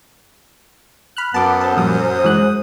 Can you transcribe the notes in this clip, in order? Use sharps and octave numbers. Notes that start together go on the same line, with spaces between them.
B5 F6 F#6
F#2 B3 A5 D6
A4 C5 A5
A#2 F3 G3 D#6
E3 G#3 F#6